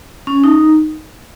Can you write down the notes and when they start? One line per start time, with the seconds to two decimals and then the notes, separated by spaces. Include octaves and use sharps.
0.27 C#4
0.44 D#4